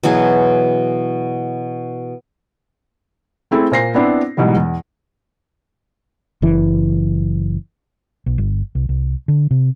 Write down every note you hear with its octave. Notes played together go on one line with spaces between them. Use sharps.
B2 E3 F#3 G#4
A3 C4 E4 G#4 A4
A#2 C5 A#6 C7
B3 C4 D4 E4
G#2 B2 E3 F#3 G3
E2
F#1 E3
B1
G1
C2
C2
D3
C3